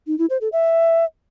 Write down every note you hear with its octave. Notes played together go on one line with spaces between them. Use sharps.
D#4
E4
C5
A4
E5